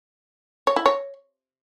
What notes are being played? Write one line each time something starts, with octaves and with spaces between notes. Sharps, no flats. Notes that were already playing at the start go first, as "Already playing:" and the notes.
C#5
E4
C#5